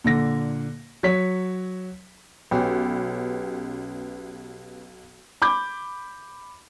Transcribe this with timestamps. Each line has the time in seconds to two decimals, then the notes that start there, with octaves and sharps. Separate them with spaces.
0.04 A#2 D3 A#6
1.03 F#3 C#5 B6
2.51 B1 C#4 G4 B4
5.42 B5 D6 G6